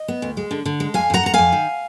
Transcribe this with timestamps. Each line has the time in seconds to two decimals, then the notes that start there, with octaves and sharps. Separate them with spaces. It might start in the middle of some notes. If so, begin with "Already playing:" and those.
Already playing: D#5
0.08 B3
0.22 D2
0.37 G#3
0.51 D3
0.65 D3
0.80 G#3
0.94 F2 F5 G#5
1.10 F2 F#5 A#5
1.23 F2 A#5
1.34 F2 F5 G#5
1.53 D#3